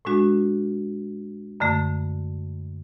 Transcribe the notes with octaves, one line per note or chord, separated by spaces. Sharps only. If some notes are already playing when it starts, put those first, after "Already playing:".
A2 G#3 D4 F#4
F#2 D3 A3